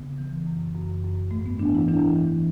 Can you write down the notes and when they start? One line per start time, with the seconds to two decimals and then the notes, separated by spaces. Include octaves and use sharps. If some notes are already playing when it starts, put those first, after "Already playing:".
Already playing: C#3 B3
0.18 E3
0.47 F#2
0.75 F#2
1.04 F#2
1.31 G#2 A3
1.46 B3
1.59 E3 D4
1.75 E4
1.88 E3 D4
2.16 E3